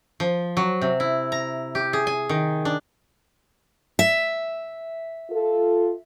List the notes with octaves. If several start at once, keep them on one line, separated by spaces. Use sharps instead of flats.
F3
F#3
C3
E4
A#5
G4
G#4
G#5
D#3
D4
E5
F4 A4